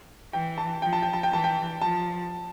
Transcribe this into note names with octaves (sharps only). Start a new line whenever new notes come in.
E3 G5
A5
F3 G5
A5
G5
A5
G5
E3 A5
G5
F3 A5